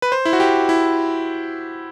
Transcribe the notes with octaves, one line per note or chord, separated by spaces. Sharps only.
B4
C5
E4
F#4
G4
E4